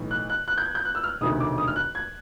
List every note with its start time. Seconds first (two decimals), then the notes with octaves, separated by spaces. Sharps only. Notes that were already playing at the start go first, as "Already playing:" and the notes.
Already playing: B1 A2 E3
0.11 F#6
0.30 F#6
0.48 F#6
0.58 G6
0.66 G#6
0.75 G6
0.85 F#6
0.95 E6
1.04 F6
1.21 E1 D2 C3 D#3 D#6
1.40 D6
1.58 D#6
1.68 F6
1.76 F#6
1.95 G#6